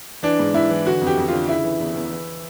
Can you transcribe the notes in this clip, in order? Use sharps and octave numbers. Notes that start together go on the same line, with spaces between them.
E3 D4
G#2
G#2 E4
E3
D3 F#4
F2
G4
F2
D3 F4
C#3 E4
E3
E2
E2
E3